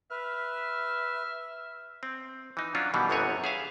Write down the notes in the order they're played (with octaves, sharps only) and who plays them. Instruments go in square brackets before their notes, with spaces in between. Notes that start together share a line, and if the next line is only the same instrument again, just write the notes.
[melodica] B4 [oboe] E5 [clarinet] F6
[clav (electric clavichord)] C4
E3 D#4
F#3 C#4 D4 F4 F#4
B2 D#3 E3 G3
G1 F#2 B3 C4 C#5 G#5
G#4 E5 F5